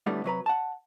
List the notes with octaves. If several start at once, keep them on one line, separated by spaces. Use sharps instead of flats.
D2 A2 D3 G3 A3 B3
C3 F#3 B4 A#5
F#5 A5